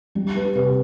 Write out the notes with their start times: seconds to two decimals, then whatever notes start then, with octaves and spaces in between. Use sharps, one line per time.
0.15 G3 G4
0.35 G4 B4
0.55 C3 G4 B4